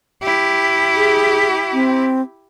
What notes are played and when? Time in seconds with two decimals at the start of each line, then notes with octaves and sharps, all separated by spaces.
0.23 E4 G4
0.96 G#4
1.73 C4